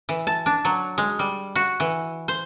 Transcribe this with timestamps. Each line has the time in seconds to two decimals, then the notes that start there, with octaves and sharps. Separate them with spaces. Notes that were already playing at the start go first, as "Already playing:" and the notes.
0.09 E3
0.27 A5
0.46 D4
0.65 F#3
0.98 G#3
1.19 G3
1.56 F#4
1.80 E3
2.28 C5